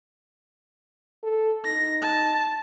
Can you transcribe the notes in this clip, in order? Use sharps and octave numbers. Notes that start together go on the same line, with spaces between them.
A4
D#4 A#6
A5